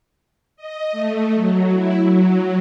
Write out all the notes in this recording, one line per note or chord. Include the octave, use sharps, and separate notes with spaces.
D#5
A3
F#3
E4
F#3